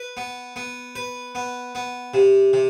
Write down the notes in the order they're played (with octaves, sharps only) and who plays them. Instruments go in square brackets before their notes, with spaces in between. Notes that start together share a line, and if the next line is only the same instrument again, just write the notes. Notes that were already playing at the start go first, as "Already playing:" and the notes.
Already playing: [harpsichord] B4
B3
B3
B4
B3
B3
C3
C3